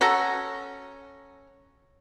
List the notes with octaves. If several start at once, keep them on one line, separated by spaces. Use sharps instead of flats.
C#4 F#4 A4 A#5